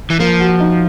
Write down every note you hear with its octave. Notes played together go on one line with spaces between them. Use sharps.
E3
F3 A#3
F#4
D#4